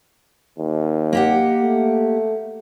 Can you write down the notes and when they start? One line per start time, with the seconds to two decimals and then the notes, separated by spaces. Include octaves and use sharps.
0.58 D#2
1.13 A#3 G4 F#5
1.62 A3